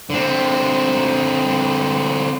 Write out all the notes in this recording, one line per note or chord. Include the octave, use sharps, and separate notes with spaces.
D3 C4